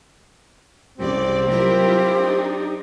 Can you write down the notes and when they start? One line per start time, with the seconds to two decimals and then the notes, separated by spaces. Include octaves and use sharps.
0.98 C2 C#3 C4 G4 D5
1.49 F#3 E4 F4 G4 A#4
2.18 D4 D#4